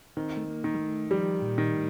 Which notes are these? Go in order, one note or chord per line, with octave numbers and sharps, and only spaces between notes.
D#3 C4
A3
A#3
D#3
G3
A3
F3 G3
A#2
D#3
A2